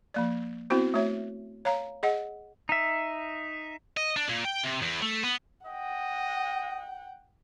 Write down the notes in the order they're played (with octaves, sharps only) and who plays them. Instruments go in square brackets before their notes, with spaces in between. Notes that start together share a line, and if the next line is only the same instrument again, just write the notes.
[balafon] F3 A#3 D5
B3 C4 E4 F#4 C5
A3 F#4 C#5 E5
C#5 F5 A#5
G#4 D#5 F#5
[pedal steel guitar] D#4 E5
[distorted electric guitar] D#5
D4
A#2
G5
C3
E2
A3
B3
[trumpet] D#5 [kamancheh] F#5 G5